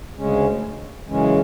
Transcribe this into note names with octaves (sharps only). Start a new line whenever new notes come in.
D2 C#3 G#3 C#4
F#2 C#3 E3 G#3 C#4